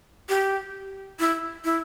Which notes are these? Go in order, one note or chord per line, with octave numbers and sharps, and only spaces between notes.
G4
E4
E4